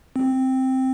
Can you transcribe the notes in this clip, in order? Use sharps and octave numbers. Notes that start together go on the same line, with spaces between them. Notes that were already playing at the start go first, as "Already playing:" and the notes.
C4